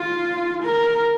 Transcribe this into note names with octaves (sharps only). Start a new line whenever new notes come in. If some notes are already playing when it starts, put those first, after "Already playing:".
Already playing: F4
A#4